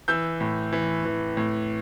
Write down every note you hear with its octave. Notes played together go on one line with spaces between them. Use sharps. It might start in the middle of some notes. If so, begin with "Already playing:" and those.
E3 E6 G6
A2
E3
E3
A2